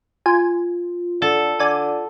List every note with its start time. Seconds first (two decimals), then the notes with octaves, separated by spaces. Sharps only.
0.26 F4 G#5
1.22 D3 A4
1.59 D3 D5 G#5 D#7